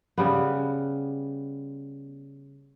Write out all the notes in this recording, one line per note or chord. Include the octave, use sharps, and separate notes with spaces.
C#3 G3 B3